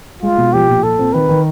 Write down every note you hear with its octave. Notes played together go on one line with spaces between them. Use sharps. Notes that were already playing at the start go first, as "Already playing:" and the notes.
G#3 F4
B2
F3 G4
A#2
F4 A4
C4
D#3 B4
D#3